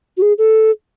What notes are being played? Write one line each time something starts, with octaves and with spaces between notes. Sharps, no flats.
F#4
G#4
A4